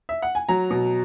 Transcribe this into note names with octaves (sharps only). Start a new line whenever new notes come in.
E5
F#5
G#5
F#3 A#5
B2